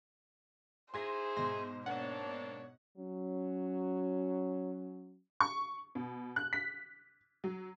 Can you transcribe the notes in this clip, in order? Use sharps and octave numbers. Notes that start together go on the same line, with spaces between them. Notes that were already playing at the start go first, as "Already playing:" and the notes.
D#4 E4 G#4 C5 C6 G#6 A#6
G#2 B2 C6 A#6
A#3 C4 D4 C#5 F#5
F#3 C#4
C#6
B2
F#6
B6
F#3